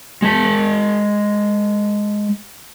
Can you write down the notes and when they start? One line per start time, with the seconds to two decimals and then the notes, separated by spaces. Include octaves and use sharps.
0.22 G#3 A5